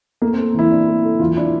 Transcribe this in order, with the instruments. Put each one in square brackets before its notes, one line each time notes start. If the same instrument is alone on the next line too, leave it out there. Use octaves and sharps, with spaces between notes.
[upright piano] A3 [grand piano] A#3
[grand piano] C4
[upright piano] A4
[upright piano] E3 [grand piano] E4
[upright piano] D4
A3
A4
[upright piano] E3 [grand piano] F4
[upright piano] D4 [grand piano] E4